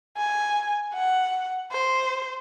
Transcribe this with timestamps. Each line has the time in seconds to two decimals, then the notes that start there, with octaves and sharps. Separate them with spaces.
0.17 G#5
0.94 F#5
1.72 C5